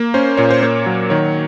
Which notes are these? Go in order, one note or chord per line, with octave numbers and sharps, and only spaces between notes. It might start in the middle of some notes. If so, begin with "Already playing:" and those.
Already playing: A#3
C#4 C5
A#2 C#5
C5
A#3 C#5
F#3
D#3 C#5